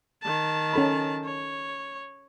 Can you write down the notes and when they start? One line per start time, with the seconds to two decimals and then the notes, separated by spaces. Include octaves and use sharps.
0.22 D#3 A5
0.73 C#4 A4 B5
1.24 C#5